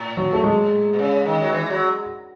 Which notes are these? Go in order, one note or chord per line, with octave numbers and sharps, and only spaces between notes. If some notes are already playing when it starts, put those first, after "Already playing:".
Already playing: A2
F#3
A3
G#3
B2
C#3
D#3
F#3
E3
F#3